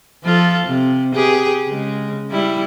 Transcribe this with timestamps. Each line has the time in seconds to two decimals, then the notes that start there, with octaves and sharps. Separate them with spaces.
0.23 F3 F4 A4
0.66 C3
1.15 G4 G#4 B4
1.68 C#3 G#3
2.30 G3 E4